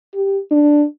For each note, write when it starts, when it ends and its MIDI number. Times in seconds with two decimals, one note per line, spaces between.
0.14 0.39 67
0.52 0.85 62